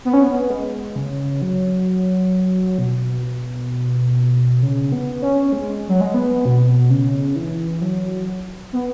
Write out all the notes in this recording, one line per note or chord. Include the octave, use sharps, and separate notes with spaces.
B3
C#4
B3
G#3
C#3
F#3
B2
C#3
B3
C#4
G#3
F#3
G#3
B3
B2
C#3
E3
F#3
B3